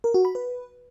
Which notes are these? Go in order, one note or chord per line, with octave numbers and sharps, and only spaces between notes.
A#4
F#4
B5
B4